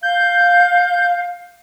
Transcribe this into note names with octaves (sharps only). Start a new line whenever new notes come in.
F5 G6